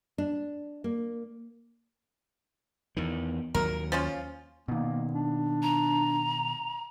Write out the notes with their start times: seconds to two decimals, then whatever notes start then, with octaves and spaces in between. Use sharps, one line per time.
0.18 D4
0.84 A#3
2.97 E2 D#3
3.55 D#2 F#3 A#4
3.92 F3 C#4 F4
4.68 B2 D#3 A#3
5.13 D4
5.62 A#5